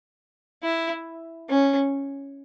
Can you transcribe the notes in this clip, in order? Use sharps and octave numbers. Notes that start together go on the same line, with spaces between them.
E4
C#4